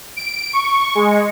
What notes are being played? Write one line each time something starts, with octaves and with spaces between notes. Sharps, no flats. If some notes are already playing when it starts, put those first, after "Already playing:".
D7
C#6
G#3